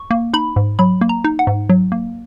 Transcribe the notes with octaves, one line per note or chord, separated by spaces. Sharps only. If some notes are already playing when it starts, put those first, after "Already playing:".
Already playing: C#6
A#3
D#4 B5
G#2
F#3 B5
A#3
A#5
D#4
F#5
G#2
F#3
A#3